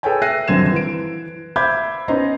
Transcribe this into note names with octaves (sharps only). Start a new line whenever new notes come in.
G#4 A4 B4 C#5 G5 G#5
E5 E6 F#6 A#6 C7 D#7
D#1 F#2 D3 C4 G#6 E7
E3 D7
C5 E5 B5 D6 G6 G#6
B3 C#4 D#4 B4 C5 A#5